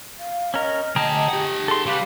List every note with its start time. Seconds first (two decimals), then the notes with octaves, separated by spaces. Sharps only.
0.19 F5
0.54 C#4 A#4 D#5
0.96 D2 G#4 G5 A5 A#5
1.29 G4 F#5
1.68 G#4 A4 C6
1.86 C#3 G3 G4 B4 F5